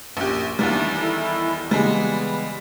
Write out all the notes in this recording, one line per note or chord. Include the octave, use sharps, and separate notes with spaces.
A#1 F#2 G4
E2 D#3 G3 D4 E4 A5
E4 A4
C#3 E3 G3 G#3 B3